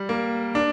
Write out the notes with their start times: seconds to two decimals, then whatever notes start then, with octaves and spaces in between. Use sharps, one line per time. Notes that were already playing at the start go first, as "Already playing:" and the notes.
Already playing: G3
0.09 A#3
0.55 D4